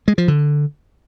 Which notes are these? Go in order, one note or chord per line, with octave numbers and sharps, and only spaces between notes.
G#3
F3
D3